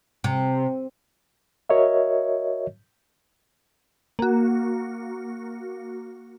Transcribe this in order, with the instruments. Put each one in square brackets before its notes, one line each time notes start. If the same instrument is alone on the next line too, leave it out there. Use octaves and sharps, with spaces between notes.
[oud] C3
[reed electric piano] F#4 A#4 C#5 D#5 E5
[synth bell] A#3 F#4